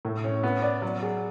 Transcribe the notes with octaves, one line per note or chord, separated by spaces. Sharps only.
A2
C#4
B3
D5
F#3
G#4